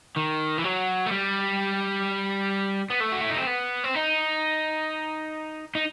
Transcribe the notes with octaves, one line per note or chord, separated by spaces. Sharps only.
D#3
E3
F#3
A3
G3
B3
A3
F#4
E4
D#4
C4
B3
C4
D#4
D#4